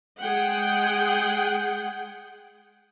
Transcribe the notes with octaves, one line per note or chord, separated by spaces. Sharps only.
G#3 G#4 F#5 G5